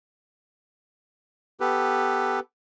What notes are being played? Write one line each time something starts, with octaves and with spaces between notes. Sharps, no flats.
B3 G4 A4 B4